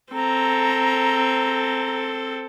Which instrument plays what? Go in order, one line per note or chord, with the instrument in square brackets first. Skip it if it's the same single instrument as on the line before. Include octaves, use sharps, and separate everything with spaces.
[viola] C4 A4 [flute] A#5